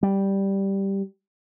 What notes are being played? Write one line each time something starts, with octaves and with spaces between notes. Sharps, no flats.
G3